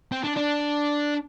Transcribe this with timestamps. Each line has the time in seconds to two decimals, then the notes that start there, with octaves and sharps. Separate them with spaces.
0.12 C4
0.24 D4
0.36 D4